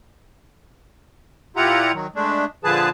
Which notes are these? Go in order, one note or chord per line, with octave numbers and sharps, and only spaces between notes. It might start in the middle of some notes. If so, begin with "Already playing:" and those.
A#2 E4 F4 G4 F#5 A#5
D#3 F#3
G#3 A3 D4
A#2 D3 F3 G#4 B4 A5